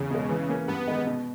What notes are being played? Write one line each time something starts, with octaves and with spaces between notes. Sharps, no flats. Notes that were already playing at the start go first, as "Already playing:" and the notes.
Already playing: E2 C#3
B2 G#3
E3
A#3 C#4
G2 B3
D#3 G#3 D#4
B2